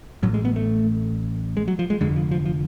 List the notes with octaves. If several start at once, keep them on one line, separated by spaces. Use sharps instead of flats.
A1 A2 F#3
G#3
B3
A3
G#3
F#3
F3
G#3
F1 F2 D3 G#3
F3
F3
F3